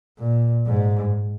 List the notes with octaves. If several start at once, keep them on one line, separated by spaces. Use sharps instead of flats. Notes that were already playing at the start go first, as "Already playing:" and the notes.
A#2
G#2